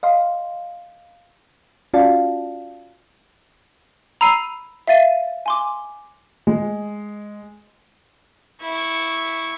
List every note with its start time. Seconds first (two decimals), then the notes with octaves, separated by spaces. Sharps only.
0.03 D#5 F5 C6
1.94 C#4 F4 F#4 D5 F5 A5
4.21 A#5 B5 E6 C7 D#7
4.88 E5 F5 A6 D#7
5.46 G#5 C6 D6
6.47 G#3
8.62 E4 C#6